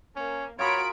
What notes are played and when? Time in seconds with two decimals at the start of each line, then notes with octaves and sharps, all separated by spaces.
0.16 A#3 C#4
0.59 F4 F#4 G#4 A#4 C#5 B5 D7